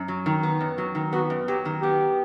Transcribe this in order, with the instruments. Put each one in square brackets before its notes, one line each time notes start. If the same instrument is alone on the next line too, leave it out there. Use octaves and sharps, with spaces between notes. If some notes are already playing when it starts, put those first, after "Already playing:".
Already playing: [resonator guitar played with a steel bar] F#2
F#3
D#3
B3
F#2
F#3
D#3
[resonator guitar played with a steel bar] B3 [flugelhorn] F#4
[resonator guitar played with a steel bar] F#2
[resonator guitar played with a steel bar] F#3 [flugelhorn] G4
[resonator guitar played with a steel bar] D#3
[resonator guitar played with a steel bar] B3 [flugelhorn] G4